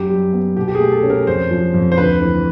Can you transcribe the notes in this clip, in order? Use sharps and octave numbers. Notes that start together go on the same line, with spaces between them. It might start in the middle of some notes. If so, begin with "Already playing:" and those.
Already playing: F#2 G4
G3
B3
B2 G4
G4
G#4
A3
A4
C#4
A#4
F2 C5
F3
F2
C5
D2 B4
E3